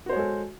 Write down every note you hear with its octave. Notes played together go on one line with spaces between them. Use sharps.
G#3 F#4 A4 C5 C#5